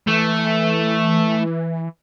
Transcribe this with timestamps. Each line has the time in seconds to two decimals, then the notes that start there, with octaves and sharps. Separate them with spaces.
0.08 E3 A3